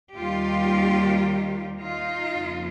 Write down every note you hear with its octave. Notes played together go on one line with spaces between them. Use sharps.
D#2 D#3 G3 F4 G4
D#4 F4
F2 C#3 F3 A#3